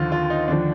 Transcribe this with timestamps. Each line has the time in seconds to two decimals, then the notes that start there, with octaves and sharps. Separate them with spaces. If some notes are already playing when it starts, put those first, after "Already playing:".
Already playing: D#2 D3 F3 F4
0.12 F4
0.30 D#4
0.48 D#2 D3 F3 D4